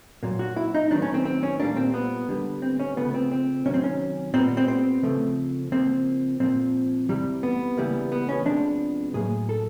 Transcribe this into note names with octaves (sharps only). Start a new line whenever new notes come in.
A#2 F#3 A#3
F#4
E4
D#4
D#3 F#3 B3 D4
C#4
C4
C4
C#4
A#2 G3 A#3 D4
C4
B3
D3 G3 B3
C4
C#4
C#3 F3 A3 B3
C4
C4
C3 D#3 F#3 C#4
C4
C#4
A#2 G3 B3 C4
C4
C4
C#3 F3 A3
C#3 F3 A#3 C4
A#2 F3 A#3 C4
C3 E3 G3
B3
C#3 E3 G3 A#3
B3
C#4
C3 F3 G#3 B3 D4
A2 F#3 A#3 G#4
A4